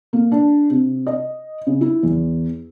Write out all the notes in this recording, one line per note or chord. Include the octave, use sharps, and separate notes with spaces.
A#3
D4
C3
D#5
C#3
E4
E2